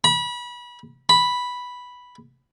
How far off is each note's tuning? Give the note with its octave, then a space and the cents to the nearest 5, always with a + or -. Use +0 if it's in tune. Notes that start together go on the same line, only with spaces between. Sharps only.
B5 -30
B5 -5